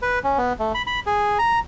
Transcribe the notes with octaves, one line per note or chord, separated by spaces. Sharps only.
B4
C#4
B3
A3
B5
B5
G#4
A#5